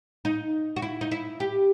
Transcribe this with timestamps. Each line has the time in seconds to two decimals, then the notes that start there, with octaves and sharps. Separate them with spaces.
0.25 D#4
0.76 F#4
0.82 E4
1.01 D#4
1.11 E4
1.40 G4